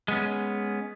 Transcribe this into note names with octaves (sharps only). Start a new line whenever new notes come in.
G#3 B3 C#4